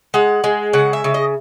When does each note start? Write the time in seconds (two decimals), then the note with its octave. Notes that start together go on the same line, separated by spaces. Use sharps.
0.14 G#3 F#5
0.44 G#3
0.73 C#3 F#5
0.93 E5
1.04 C#3
1.14 D#5